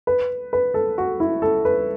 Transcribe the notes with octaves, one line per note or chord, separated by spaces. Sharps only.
B4
B4
A4
F#4
E4
A4
B4